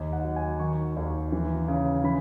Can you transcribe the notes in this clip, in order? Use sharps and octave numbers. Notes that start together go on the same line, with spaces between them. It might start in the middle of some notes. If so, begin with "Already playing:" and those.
Already playing: D#2 D#5
F#5
F#3
G#5
D#3 C#6
D#2
E3
C#3
E3 B5